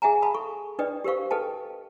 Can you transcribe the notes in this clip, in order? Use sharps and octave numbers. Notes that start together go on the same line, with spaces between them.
G#4 E5 F#5 G#5 A#5
F5 A5 B5 D#6
A4 C#6
D4 B4 D5 D#5 G5 D#6
G4 A#4 C5 F5 C#6
A4 B4 D#5 G5 A5